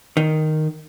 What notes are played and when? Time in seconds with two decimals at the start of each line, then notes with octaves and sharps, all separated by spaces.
0.17 D#3